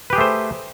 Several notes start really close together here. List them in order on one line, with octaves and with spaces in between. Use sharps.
B4 G4 G#4 A3 C5